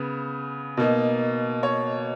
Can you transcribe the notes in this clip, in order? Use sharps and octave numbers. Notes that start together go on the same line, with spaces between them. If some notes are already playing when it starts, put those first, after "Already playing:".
Already playing: C#3 B3
B2 A#3 D#4
C#5